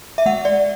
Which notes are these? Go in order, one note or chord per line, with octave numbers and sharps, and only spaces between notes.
E5
G#3 F#5
D5